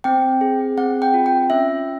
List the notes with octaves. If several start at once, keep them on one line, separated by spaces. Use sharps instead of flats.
C4 G5
G#4
C4 F#5
G5
F4
G5
C#4 E5